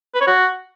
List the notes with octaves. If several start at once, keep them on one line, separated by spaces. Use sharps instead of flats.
B4
C#5
F#4